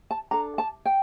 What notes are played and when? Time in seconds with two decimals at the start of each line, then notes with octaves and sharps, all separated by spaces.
0.11 A5
0.31 D4 A4 A#5
0.58 A5
0.85 G5